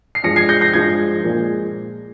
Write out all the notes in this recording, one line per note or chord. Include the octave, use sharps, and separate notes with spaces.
C7
G2 F3 G#3 A#6 C#7
G#6 C7
G6 A#6
G6 A#6
G2 F3 G#3 G#6 C7
A#2 F3 G#3